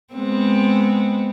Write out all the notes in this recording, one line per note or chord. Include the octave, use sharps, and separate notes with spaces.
G#3 B3 C4